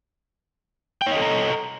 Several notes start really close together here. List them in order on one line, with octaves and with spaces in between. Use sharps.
G5 C#5 D#5 A4 A#5